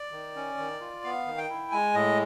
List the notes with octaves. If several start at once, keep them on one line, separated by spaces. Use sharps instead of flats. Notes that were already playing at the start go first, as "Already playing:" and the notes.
Already playing: D5
D#3
C#4
D#3
F4
B3 F5
D#3
G5
E4
G#3 G#5
A2 D#5